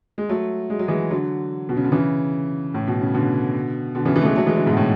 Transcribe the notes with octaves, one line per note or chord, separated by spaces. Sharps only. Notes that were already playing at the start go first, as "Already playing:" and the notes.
G#3
F#3 A3
G#3
F#3
E3 G#3
D3 F#3
B2
C#3
D3
C#3 E3
A2
B2
C#3
B2 D3
B2 D3
C#3 E3
C#3 E3
A3
E3 G#3
F#3 A3
E3 G#3
D3 F#3
G#2 B2
A2